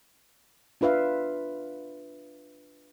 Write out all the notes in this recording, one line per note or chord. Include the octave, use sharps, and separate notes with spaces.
D4 F4 B4 E5 F5